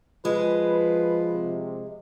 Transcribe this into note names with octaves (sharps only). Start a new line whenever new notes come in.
F3 G#3 B4
C3